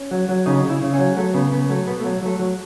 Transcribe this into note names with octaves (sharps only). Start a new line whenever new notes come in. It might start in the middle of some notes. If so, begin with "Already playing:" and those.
Already playing: C#4
F#3
F#3
C#3 D#4
C#3
E4
C#3
C#4
F#3
F#3 A3
C#3 B3
C#3 B3
F#3 A3
B2 B3
F#3 A3
F#3 A3
F#3